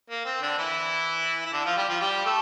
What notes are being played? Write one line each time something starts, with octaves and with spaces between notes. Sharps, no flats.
A#3
C4
D3 D4
E3 E4
E4
D3 D4
F3 F4
G3 G4
F3 F4
G3 G4
A3 A4